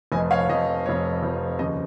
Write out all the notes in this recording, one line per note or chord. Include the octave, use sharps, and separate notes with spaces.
F1 F2 F3 D#5 G#5
C#5 F5
F1 F2 F3 D#5
F1 F2 F3 C#5
F1 F2 F3
D#2 C#3 F3 D#5